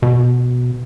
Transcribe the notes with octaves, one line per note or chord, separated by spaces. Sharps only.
B2